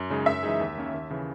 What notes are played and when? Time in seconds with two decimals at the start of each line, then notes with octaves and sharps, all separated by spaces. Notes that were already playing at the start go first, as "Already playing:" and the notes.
Already playing: F#2
0.10 C#3 G#3 D#4 G#4
0.26 F#2 E5
0.43 E3 G#3 D#4 G#4
0.60 D#2
0.78 D#3 A#3 C#4
0.94 D#2
1.10 C#3 E3